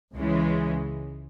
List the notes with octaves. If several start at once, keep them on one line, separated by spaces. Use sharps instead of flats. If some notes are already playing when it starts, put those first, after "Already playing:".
C#2 C#3 E3 G#3